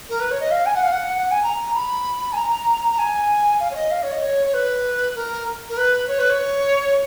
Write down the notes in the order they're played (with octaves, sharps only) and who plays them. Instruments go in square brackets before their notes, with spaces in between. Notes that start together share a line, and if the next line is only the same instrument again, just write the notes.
[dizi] A#4
B4
C#5
D#5
F5
G#5
F#5
F5
F#5
F#5
G#5
A#5
B5
G#5
A#5
A#5
G#5
F5
C#5
D#5
F5
C#5
D#5
C#5
C#5
B4
A#4
A#4
B4
C#5
B4
C#5